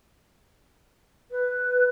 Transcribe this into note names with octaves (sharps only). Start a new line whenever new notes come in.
B4